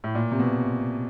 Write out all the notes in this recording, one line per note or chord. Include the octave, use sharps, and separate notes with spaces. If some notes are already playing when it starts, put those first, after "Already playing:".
A2
A#2
C3
B2